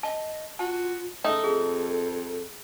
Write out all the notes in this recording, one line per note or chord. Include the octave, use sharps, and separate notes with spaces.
D#5 A5
F4 F#4 A5
C#3 A3 D#4 A4
F2 G#4